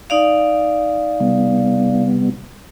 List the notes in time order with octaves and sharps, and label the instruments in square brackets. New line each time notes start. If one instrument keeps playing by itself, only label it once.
[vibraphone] D#4 D5 F5
[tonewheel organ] C3 G3 B3